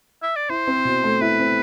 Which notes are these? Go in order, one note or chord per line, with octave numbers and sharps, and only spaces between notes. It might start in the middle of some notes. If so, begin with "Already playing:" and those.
E5
D5
E4 C5
C4
B2
A3
E4 B4
C4